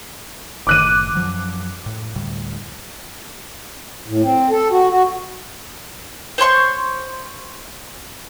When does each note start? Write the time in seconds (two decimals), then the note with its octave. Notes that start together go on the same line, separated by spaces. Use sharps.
0.67 F#1 A2 D#3 D6 F#6 D#7
1.15 F#2 F3 F#3
1.86 A2
2.16 D2 A2 G3
4.08 A2
4.23 C4
4.50 A4
4.71 F#4
4.90 F#4
6.38 C5 C#5 C6 C#6